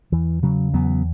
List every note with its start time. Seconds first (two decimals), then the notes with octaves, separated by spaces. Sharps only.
0.12 E2 E3
0.43 C#3 F#3
0.74 E2 F#3 B3